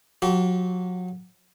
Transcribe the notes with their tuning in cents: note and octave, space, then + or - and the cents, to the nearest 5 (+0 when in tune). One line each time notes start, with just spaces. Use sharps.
F#3 -30 G4 -45